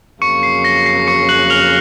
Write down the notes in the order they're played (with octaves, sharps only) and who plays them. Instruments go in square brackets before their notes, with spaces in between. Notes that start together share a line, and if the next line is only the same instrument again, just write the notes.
[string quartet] F2 C#3 F#3 A#3 [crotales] C#6 C#7
[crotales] C7
A#6
C7
C#6 C#7
F#6 F#7
F6 F7